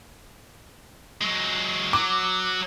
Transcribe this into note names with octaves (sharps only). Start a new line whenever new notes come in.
F#3 G#3
F#3 D6